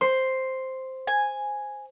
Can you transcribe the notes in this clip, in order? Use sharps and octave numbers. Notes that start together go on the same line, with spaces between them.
C5 C6
G#5